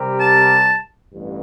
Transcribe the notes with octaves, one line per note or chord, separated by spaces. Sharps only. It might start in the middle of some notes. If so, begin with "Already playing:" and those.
Already playing: C3 G3 C4 G4 A#4
A5
A1 G2